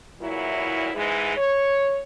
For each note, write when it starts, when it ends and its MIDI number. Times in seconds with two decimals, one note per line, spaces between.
0.21 0.89 40
0.21 0.89 46
0.21 0.89 54
0.21 0.89 64
0.94 1.35 44
0.94 1.35 52
0.94 1.35 56
1.36 1.98 73